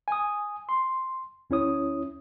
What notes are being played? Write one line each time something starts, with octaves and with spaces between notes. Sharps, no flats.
G#5 D#6
C6
D2 C#4 E4 C#5 D#6